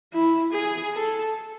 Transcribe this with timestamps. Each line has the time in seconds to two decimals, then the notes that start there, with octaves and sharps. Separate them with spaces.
0.13 E4
0.53 G#4
0.94 A4